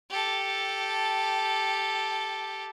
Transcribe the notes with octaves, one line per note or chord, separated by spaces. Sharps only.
G4 A4